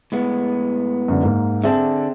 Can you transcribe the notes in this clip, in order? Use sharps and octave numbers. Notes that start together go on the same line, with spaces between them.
A2 G#3 B3
F#2 D3
G#2 A#3
D3 C4 G#4 D5 E5 A5